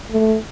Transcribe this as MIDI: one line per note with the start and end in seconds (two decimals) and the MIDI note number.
0.11 0.36 57